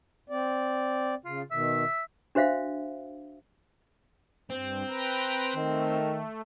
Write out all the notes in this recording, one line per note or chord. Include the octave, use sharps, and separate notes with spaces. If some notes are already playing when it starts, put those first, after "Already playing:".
C4 D5
C#3 F4
B2 D#3 E5
D4 F#4 C5 E5 F5
G2 C4
B4 G5 A#5
D#3 A3